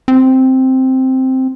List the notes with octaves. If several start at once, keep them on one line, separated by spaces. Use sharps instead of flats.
C4